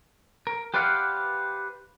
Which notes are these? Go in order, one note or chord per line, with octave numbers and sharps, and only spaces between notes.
A#4
G4 B4 C5 D5 F5 F#5